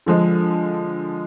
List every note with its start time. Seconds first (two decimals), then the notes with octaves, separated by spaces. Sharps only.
0.06 D3 F3 G#3